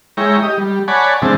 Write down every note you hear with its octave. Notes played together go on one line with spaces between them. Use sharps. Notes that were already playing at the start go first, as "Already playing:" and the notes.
G#3 E4 C#5 G5 A#5
G4 D#5
G3
C#5 D5 F#5 G#5 A5 B5
C3 E3 G#3 C4 D4 A5